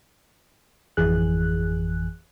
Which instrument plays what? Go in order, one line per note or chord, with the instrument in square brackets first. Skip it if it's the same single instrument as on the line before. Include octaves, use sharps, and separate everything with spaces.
[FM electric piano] G#1 F2 E3 G#4 F#6